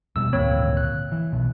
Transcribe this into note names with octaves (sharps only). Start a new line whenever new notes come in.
E1 B2 G3 E6
G#1 D2 A#2 A#3 C4 C#5
F#6
E3
B1 B2